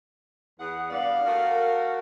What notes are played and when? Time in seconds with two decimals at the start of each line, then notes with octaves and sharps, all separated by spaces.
0.58 E2 G#4 F#5
0.90 G2 B3 D5 F5
1.25 A3 F#4 A#4